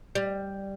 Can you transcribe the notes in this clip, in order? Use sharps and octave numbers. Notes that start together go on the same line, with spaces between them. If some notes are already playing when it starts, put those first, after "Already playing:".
G3